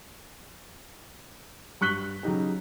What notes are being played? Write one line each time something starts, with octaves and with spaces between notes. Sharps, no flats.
G2 C#6 F#6 B6 F#7 G7
C#3 F#3 D#4 G4